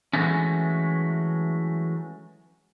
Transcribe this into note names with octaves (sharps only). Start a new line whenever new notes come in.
E3 F#3 G#3 A3 C#4